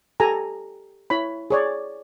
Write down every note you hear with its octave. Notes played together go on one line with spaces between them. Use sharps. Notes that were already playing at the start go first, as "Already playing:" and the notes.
G4 A4 G#5 A#5
E4 C#5 B5
G#4 C#5 D5